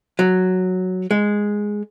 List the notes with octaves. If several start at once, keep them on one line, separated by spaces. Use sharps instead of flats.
F#3
G#3